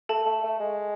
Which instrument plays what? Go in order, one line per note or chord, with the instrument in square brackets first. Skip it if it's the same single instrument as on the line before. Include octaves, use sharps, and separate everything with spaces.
[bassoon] A3 [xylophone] A4 A5
[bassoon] A3
A3
G#3